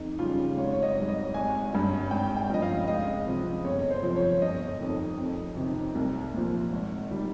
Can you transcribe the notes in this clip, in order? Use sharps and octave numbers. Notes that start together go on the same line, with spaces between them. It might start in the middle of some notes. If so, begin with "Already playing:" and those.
Already playing: F2 D#4
C#3 G3 F4
G#1 C#5
C#5
D#5
G#2 G3
D#5
G#1 G#5
G2 G3
G#1 G5
G5
G2 F3 D#5
F5
C#2 D#5
C3 F3
G1 C#5
C5
F2 C3 F3
C#5
G1 D#5
F2 D#3
F2
C3 D#3
C2
A#2 F3
G#1
D#3 G3